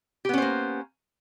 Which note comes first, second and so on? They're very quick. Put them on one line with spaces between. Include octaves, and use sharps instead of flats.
G4 B3 C#4 C5 A#3